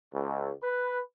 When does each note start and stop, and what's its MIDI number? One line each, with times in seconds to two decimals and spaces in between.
0.13 0.51 37
0.63 0.99 71